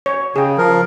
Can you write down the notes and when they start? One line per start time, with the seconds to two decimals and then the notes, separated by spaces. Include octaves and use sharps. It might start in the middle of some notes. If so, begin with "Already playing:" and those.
0.06 C#5
0.36 C#3 G#4 G5
0.58 F3 A#4